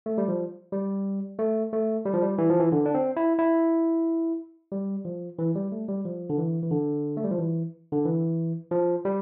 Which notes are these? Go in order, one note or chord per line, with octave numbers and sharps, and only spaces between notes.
A3
G3
F3
G3
A3
A3
G3
F3
G3
E3
F3
E3
D3
D4
C4
E4
E4
G3
F3
E3
G3
A3
G3
F3
D3
E3
E3
D3
A3
G3
F3
E3
D3
E3
F3
G3